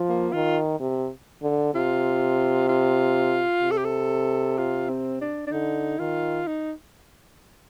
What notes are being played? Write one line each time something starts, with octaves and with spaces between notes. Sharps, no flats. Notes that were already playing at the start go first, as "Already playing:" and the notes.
Already playing: F3
A#3
D#3 F4
C3
D3
C3 F4
F4
C3
A4
G4
A4
F4
C4
D4
D4
D3 D#4
D#3 F4
D#4